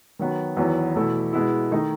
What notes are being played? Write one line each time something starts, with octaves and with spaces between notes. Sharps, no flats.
D#3 F#3 B3
E2 D#3 F#3 B3 E4
E2 B2 A3 E4
B2 G#3 B3 E4
D#3 A3 D#4